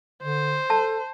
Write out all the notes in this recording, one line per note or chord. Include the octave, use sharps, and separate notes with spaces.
D3 C5
A4 A5